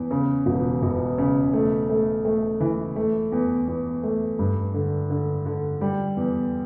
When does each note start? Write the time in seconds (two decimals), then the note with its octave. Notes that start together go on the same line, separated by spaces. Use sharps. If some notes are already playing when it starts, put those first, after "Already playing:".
Already playing: E2
0.11 C#3
0.46 E1
0.82 E1
1.18 C#3
1.53 A3
1.90 A3
2.25 A3
2.61 E3
2.96 A3
3.32 E2
3.68 E2
4.03 A3
4.39 G2
4.74 D3
5.10 D3
5.46 D3
5.81 G3
6.17 E2